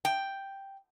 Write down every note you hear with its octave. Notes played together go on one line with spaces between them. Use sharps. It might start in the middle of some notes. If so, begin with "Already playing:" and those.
G5